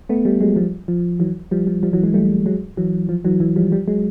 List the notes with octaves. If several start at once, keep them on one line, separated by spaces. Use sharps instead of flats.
A3 B3
G3 A3
F#3 G#3
F3 G3
F3
E3 F#3
F3 G3
F3
F3 G3
E3 F#3
F#3 G#3
G3 A3
F#3 G#3
E3 F#3
F3
E3 F#3
E3 F#3
F3 G3
F3 G3
F#3 G#3